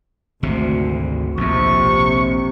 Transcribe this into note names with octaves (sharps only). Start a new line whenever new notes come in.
G#1 D2 C3
A#1 F2 C3 C#6